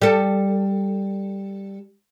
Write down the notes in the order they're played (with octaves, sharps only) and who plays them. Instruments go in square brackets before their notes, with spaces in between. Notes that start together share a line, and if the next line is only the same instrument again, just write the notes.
[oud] G3 A4